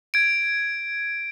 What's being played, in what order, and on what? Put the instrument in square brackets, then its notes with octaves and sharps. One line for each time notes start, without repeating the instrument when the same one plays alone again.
[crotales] G#6 D7